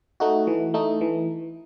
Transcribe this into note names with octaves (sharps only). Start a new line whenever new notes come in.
A3 D#4 F#4
E3
A3 D#4
E3